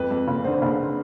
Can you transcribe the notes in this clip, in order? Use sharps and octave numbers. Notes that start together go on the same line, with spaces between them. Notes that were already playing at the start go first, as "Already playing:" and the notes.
Already playing: F2 B4
F2
F#1
D3 C5
F#1